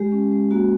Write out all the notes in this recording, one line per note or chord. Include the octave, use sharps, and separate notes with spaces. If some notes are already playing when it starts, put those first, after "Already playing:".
Already playing: G#3 G4
C#4
G#3
A#3 F#4